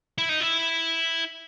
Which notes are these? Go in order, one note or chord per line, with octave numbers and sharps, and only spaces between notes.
E4
D#4
E4